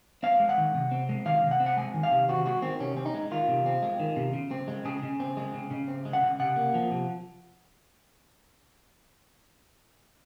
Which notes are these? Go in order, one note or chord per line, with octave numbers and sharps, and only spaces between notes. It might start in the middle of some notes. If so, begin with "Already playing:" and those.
C4 F5
G#3
F#5
D#3
C3
C4
G#3
D#3 F5
C3
F#5
C4
F#5
G#3 G#5
D#3
F5
C3
C4 F#4
G#3 F#4
D#3 C4
C3 C#4
C4
D#4
G#3
D#3 F4
C3
C4
G#3
D#3
C3
C#3
C4
G#3
C#3 G#4
C#3
C4
G#3
C#3
C#3
C4
G#3
F#5
C#3
C3 F#5
A#3
F3
C3